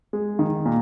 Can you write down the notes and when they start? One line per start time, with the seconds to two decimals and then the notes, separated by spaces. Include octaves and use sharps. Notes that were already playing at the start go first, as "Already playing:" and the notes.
0.13 G#3
0.39 D#3
0.65 A#2